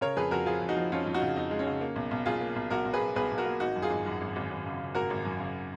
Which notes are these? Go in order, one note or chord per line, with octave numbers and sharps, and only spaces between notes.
C#3 A#4 C#5
F2 G#4 B4
F2 F#4 A#4
F3 F4 G#4
F2
D#4 F#4
F3
F2 C#4 F4
F2
D#4 F#4
C#3
F2 D#4
G#3
C#4
C#3
A#3
B1
B1
B1 F4 G#4
A#3
B1
B1 F#4 A#4
B1
G#4 B4
B1
B1 G#4 B4
B1
F#4 A#4
A#3
G#1 D#4 F#4
F#2
F4 G#4
G#1
F#2
G#1
G#1
G#1
C#3
C#3
G#1 F#4 A#4
G#1
F#2
C#3